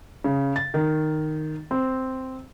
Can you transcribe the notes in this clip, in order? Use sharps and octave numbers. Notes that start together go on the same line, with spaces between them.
C#3
A6
D#3
C4